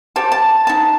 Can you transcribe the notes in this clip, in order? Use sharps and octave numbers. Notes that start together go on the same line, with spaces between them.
G4 C5 A5
A5
D#4 A5